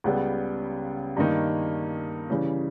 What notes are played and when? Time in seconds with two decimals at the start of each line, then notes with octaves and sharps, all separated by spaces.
0.04 C#2 C#3 G3 B3
1.17 G2 D#3 A#3 D#4
2.30 C#3 E3 G3